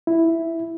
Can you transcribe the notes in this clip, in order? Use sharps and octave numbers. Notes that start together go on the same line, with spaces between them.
E4